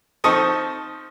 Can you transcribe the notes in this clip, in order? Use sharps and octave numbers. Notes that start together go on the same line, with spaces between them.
F3 C4 D#4 A4 C#6 D#6